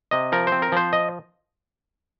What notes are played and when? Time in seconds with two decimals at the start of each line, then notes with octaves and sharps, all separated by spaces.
0.11 C3 D#5
0.32 F3 A#4
0.47 C5
0.52 C4
0.62 A#4
0.72 F3 C5
0.93 D#5